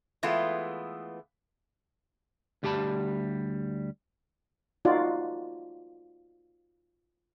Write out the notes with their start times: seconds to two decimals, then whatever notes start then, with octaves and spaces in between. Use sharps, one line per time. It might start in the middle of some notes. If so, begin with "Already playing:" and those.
0.23 E3 G#3 A3 B3 F4
2.63 D2 G3 G4 F5 A5 B5
4.85 D#4 F4 F#4 D5